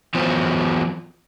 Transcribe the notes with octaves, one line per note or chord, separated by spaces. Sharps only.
E3 F#3 B3 F4 C5